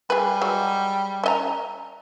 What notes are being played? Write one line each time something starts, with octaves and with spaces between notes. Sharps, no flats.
G3 G#4 B4
F#3 G#3 F#4
C#4 D#5 A#5